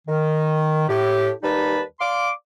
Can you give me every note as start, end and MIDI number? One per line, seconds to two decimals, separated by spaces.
0.08 0.85 51
0.88 1.31 45
0.88 1.31 67
1.43 1.80 39
1.43 1.80 55
1.43 1.80 63
1.43 1.80 71
1.43 1.80 81
1.43 1.80 83
2.00 2.29 74
2.00 2.29 77
2.00 2.29 84
2.00 2.29 86